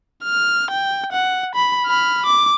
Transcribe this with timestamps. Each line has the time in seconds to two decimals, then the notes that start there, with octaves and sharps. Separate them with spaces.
0.24 F6
0.70 G5
1.12 F#5
1.55 B5
1.86 B5 F6
2.26 D6